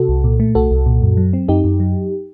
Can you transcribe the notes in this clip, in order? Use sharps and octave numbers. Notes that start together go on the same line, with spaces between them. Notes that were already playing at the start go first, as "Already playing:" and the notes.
Already playing: C3 F#4 A4
C2
A#2
A3
C2 F#4 A4
C2
A#2
F#2
F#3
C4
F#2 D#4 G4
F#2
F#3